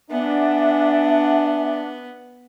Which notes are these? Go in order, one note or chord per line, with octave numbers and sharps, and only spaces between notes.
B3 D4 E5 F#5 G#5